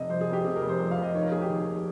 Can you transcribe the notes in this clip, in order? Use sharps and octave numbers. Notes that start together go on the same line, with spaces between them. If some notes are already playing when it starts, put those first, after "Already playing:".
Already playing: F1 C3 D#5
F2 C5
G#4
F1
G4
C3 G#4
A#4
F1
C5
F2
F5
F1
D#5
D#3 C#5
A#4
F1 G#4
G4
D#2